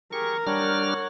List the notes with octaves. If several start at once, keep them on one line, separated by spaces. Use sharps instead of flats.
G4 G#4 A#4 C#6
G3 D4 C#5 F#5 F6